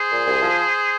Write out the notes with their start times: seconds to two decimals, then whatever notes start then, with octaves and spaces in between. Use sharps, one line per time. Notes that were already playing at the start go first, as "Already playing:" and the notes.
Already playing: G#4 C5
0.09 A#2
0.26 C2
0.42 F3